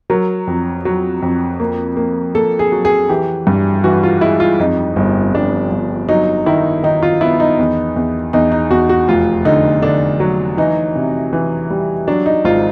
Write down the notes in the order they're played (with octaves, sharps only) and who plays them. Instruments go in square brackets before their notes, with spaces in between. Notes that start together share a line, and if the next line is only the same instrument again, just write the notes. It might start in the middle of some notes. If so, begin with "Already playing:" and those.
[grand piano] F#3 A#4
F2
F#3
F2
A#3
A#3
A#3 A4
G#4
F#3
G#4
E3 G4
G2
E3 F#4
F4
G#3 E4
F4
F2 D#4
G1
G1 D4
G1
F#3 D#4
D#3 E4
D#3 D#4
F4
B3 E4
D#4
E2
E2
E2 D#4
D#4
E2 F#4
F#4
F1 F4
D3 D#4
D3 D4
F#3
E3 D#4
C3
E3
G3
F#3 D4
D#4
G#1 F4